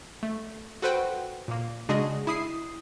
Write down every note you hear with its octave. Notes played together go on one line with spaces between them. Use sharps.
A3
F#4 A4 B4 C5 F#5 G5
A#2 A#3
C#3 G#3 D4 F#4 G#4 D#5
E4 D#6 C7